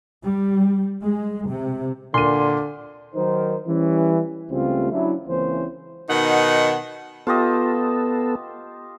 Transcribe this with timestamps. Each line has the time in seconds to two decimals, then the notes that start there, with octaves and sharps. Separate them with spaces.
0.23 G3
1.01 G#3
1.48 C3
2.14 A#2 D3 C6 D#7
3.15 D#3 F#3 D#4 A#4 C5
3.67 E3 G3 C#4
4.51 C#2 C#3 G3 A3 C4 F4
4.92 F#3 C#4 D4 E4
5.28 C#2 E3 A#3 C4 C#4 C5
6.10 B2 D#3 D#4 F#5
7.27 B3 F4 G4 A4 D#5